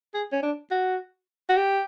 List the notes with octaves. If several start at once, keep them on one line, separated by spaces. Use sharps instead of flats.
G#4
C#4
D4
F#4
F#4
G4